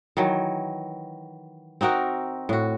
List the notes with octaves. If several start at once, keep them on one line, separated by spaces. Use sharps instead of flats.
D#3 E3 F#3
C4 D#4 F#4 A#4
A2 F#4